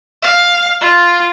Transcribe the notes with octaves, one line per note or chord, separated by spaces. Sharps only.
F5
F4